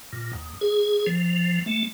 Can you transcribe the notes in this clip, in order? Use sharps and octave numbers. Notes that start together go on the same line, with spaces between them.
A#2
D#2
G#4
F3
A3